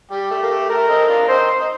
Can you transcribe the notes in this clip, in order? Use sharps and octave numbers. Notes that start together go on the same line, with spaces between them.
G3 G4
A3
A#3
A3
A3 A#4
C4 D#4
D4 F4
D4
C4 D#4 C5
D#4